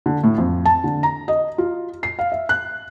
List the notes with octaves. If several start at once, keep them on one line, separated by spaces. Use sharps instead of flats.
D3
A2
F2
A5
D3
A#5
D#5
F4
C7
F5
E5
F#6